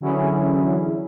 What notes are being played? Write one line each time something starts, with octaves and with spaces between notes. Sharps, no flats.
D3 E3 F#3 C#4 E4 G#4